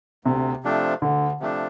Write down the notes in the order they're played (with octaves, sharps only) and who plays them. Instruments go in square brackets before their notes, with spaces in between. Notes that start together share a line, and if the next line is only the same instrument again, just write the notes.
[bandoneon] D2 [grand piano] C3
[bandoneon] C3 F3 A3 D4
[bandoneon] D2 [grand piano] D3
[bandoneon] C3 F3 A3 D4